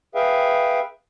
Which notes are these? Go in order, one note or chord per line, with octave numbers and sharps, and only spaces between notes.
G#4 B4 E5 F5 G5